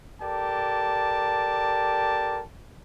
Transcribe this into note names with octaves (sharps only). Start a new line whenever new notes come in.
G4 A4 A#4 D5 A5